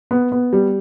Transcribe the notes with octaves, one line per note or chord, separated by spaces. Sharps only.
B3
B3
G3